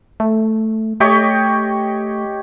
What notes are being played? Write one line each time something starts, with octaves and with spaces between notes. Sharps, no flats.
A3
A3 G4 C#5 D#5